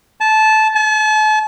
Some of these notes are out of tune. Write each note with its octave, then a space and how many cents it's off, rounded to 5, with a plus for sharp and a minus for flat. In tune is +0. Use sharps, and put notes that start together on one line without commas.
A5 -15
A5 -40